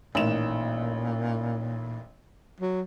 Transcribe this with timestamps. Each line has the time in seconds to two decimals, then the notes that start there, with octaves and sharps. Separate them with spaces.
0.15 A1 A#2 D#3 E7
2.61 F#3